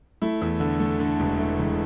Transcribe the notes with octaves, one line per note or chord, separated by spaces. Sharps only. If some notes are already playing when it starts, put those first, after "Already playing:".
A3 E4
E2
D3
A3
D3
E1
A3
E1